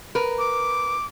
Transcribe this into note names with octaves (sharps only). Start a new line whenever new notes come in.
A#4 B4
D6